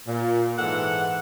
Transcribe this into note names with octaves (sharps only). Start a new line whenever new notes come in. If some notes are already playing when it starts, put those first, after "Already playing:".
A#2
G#2 E3 A4 F#5